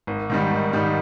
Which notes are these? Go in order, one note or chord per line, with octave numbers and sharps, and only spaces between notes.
G#1
G#2 D#3 G3
G#1
G#2 D#3 G3